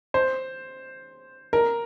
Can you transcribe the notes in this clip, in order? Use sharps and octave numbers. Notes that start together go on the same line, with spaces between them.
C5
A#4